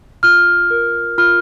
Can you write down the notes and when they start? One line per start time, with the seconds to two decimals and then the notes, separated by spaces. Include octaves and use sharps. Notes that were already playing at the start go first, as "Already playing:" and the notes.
0.23 F4 F6
0.70 A#4
1.18 F4 F6